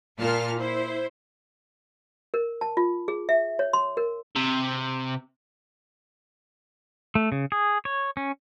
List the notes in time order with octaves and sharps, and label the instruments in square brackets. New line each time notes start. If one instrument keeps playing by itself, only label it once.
[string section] A#2 F4 A5 F6
E4 C5
[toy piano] A#4
A5
F4
G#4
E5
C#5
C6
A#4
[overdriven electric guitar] C3
[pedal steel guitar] A3
C#3
G#4
C#5
C#4